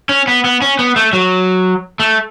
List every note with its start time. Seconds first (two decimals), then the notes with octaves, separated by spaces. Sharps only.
0.09 C#4
0.28 B3
0.44 B3
0.62 C#4
0.79 B3
0.96 A3
1.13 F#3
2.00 A3